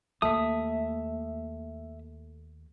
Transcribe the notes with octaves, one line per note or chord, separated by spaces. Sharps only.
D#2 A3 E5 D#6